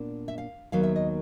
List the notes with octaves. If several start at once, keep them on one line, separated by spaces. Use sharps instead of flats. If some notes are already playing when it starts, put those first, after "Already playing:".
Already playing: A#2 B3 D4
E5
F5
D#2 D#3 F#3 B3 F5
E5
D#5